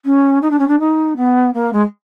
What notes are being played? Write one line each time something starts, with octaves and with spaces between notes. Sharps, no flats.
C#4
D#4
D4
C#4
D4
D#4
B3
A#3
G#3